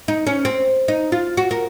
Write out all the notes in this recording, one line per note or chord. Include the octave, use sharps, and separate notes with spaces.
D#4
C#4
C4
D#4
F4
F#4
A#4